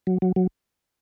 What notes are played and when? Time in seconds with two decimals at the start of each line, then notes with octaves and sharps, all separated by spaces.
0.07 F#3
0.22 F#3
0.36 F#3